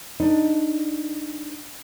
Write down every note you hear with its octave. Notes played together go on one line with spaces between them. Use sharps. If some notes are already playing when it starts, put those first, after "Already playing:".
D4 D#4